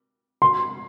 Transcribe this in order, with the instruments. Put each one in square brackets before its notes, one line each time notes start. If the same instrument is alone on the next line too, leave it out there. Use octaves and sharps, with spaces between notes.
[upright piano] C6